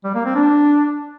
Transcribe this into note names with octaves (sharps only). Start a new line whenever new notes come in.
G3
A#3
C4
D4